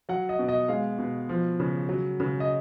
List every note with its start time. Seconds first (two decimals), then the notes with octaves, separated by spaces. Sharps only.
0.09 F#3 F#5
0.29 D#5
0.39 B2
0.49 D#5
0.68 G#3 F5
0.99 B2
1.29 F3
1.60 C#3
1.89 F#3
2.20 C#3
2.40 D#5